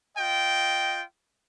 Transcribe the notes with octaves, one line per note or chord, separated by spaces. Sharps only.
F4 D#5 G5